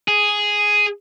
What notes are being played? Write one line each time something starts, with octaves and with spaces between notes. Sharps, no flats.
G#4